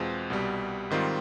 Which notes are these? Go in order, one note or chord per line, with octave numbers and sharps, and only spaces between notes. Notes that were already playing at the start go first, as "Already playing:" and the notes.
Already playing: E2 B2 G#3 C4 F4
C2 B2 G3
G#2 D#3 G3 C4 F4